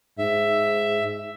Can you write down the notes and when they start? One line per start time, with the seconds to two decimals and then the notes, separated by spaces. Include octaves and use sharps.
0.19 G#2 E5